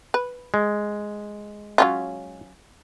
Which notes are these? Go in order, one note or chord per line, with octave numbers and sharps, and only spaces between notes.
B4
G#3
F#3 C#4 F4